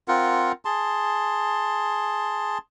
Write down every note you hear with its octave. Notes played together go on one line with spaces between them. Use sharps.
C4 F4 A#4 F#5
G#4 A5 C6